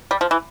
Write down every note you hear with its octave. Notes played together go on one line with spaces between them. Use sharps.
G3
F3
E3